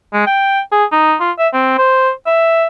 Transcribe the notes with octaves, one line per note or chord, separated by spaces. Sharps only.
G#3
G5
G#4
D#4
F4
E5
C4
C5
E5